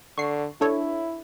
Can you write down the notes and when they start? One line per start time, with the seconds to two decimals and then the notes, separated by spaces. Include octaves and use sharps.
0.18 D3 C#6 C7
0.61 D4 E4 A4 C#5